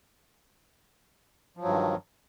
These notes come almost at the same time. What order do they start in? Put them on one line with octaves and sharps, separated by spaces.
F3 F#3 G2 D#3